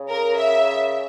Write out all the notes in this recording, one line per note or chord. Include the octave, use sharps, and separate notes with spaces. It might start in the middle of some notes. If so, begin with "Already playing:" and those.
Already playing: C#3
A#4
E5